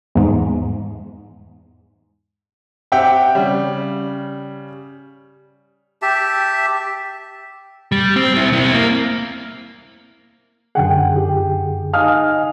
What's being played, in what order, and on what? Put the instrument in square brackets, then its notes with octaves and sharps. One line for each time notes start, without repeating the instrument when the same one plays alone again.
[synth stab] E2 G#2
[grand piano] C4 G4 E5 F#5 G5
C#3 G3
[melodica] G4 E5 A5
[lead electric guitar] G3
C4
C4 E4
C4 E4
A#3
[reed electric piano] F#2 D3 G#4 [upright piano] F#5 G5
[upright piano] G4
[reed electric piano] D#4 D#5 G#5 [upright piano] F5 D#6 F6